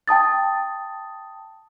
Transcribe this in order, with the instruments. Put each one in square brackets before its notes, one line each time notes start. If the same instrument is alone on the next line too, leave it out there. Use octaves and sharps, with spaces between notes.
[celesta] G5 A5 D#6 A6